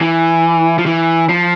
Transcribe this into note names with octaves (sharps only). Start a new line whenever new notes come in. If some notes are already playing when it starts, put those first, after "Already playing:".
E3
F3
E3
F3